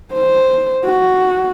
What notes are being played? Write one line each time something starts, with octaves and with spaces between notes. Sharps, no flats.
C5
F#4